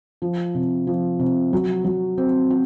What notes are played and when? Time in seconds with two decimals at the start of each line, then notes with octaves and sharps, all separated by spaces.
0.22 F3
0.55 C3
0.87 F3
1.19 C3
1.53 F#3
1.85 F#3
2.18 C4
2.50 F#4